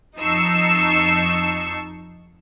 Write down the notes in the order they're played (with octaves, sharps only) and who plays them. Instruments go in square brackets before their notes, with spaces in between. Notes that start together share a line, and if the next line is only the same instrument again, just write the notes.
[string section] F2 D#4 A5 C#6 E6 C7